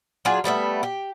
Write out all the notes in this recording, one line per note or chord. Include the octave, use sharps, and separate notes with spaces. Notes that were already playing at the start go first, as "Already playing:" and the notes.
F#3 D4 F4 G#4
G3 A3 B3 E5
G4